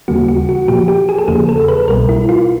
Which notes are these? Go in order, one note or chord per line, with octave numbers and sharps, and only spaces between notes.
D#2 C#3 E3 G3 A#3 F#4
F#4
F#4
A#2 F3 A#3 G4
G4
G#4
A4
E2 C#3 F3 A#3 G#4
A4
B4
C2 B2 G3 A#4
E4
F4